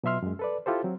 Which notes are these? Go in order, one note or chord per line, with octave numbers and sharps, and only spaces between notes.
B2 F#3 F4 E5 C6 F6
F#2 G#3
A4 B4 D5
E4 F4 G4 A4 C5
F#3 C4